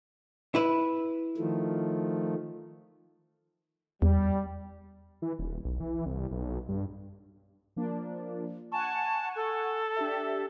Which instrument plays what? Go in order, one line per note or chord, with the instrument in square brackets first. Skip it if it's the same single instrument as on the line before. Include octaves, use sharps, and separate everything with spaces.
[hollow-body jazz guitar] E4 B4
[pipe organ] D#3 F3 A3
[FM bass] E2 [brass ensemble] G3
[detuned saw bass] E3
D#1
B1
E3
C2
B1
G2
[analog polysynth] F3 A#3 D4
[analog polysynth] F#5 G#5 C#6 [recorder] A5
[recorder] A4
[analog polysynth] D4 G4 E5